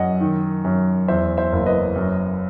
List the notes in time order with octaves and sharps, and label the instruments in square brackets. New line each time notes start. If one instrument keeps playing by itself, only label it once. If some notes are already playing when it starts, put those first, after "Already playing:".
Already playing: [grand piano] F#2 D#5 F#5
D#3
F#2
E2 C5 E5
C5 E5
F#1
B4 D#5
F#2